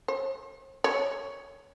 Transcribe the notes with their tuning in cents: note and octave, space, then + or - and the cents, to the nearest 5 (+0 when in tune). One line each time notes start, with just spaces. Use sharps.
C#5 -45
C#5 +5